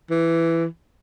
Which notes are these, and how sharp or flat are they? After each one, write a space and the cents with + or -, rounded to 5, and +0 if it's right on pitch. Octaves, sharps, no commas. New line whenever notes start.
E3 +10